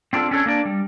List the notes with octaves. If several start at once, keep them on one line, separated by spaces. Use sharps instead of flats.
C4 D4 F4 A4
C#4 D4 A4 C#5
A#3 D4 D5
G3